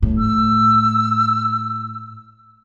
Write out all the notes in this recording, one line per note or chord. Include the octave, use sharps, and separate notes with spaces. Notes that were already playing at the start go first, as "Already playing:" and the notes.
A2
E6